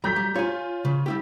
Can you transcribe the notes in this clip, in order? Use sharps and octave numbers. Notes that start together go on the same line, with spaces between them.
G2 F#3 A#5 G6 B6
G3
F4 C#5 G#5
C#3
G3 E4 G4